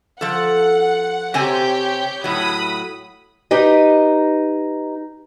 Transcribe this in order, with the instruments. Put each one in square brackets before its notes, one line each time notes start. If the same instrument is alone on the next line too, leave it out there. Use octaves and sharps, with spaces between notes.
[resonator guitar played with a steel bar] F3 A4 [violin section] F#5
[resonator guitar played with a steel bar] C3 C4 G#5 [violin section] G4 C#5 G6
[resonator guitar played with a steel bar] A2 F#3 [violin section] B5 D#6
[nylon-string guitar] D#4 G4 B4 D#5